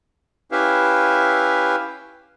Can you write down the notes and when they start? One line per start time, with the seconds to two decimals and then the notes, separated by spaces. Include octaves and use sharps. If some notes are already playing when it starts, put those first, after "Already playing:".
0.52 C#4 E4 G4 B4 E5 F5